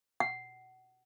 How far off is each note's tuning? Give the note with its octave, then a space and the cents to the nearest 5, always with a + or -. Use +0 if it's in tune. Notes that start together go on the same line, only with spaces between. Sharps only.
F#5 +25